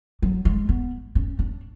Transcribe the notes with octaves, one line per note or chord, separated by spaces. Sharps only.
F#3
G#3
B3
C#4
D4